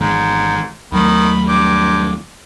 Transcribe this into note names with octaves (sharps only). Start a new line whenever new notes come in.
G#1 G#2 E3 G#3
D#2 D#3 F#3 A3 B5
G2 D6